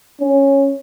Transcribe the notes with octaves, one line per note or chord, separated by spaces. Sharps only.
C#4